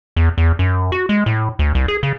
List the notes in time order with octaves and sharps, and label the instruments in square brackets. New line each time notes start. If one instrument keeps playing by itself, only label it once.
[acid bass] E2
E2
F#2
F#4
G#3
A2
D2
C2
G#4
C#3